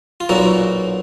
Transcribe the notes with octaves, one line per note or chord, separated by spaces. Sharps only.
F4
B1 A#2 F#3 A#3 E4 F#4